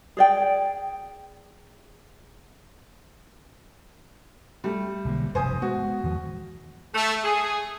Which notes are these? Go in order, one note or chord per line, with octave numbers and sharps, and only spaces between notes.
G#4 D5 G5
G3 A3
B1 D3 A#3
F1 G2 B2 C5 G#5 D#6
G#3 B3 F#4
E2 D#3 F3
A3
G#4